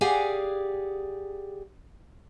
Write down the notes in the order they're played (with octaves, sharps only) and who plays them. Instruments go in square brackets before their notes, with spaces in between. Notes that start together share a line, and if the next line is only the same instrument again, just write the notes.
[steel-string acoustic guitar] G4 G#4 D5 F5 F#5 G#5